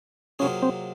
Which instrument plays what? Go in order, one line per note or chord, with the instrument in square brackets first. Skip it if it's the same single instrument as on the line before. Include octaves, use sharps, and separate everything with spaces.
[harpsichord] C3 F#3 A#3 F4 G#4 [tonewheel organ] C#4
[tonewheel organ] C4